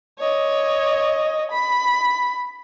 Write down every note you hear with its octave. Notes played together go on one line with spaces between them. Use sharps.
C#5 D#5
B5